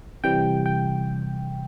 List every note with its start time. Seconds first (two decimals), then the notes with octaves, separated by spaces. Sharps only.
0.24 C3 E3 G3 G5
0.66 G5